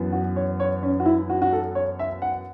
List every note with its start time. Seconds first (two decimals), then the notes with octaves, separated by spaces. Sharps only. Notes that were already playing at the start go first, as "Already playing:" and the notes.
Already playing: F#2 E3 B3
0.12 F#4
0.36 C#5
0.60 C#5
0.83 C#4
1.00 F#4
1.06 E4
1.30 F#4
1.42 F#4
1.53 A4
1.75 C#5
1.99 E5
2.22 F#5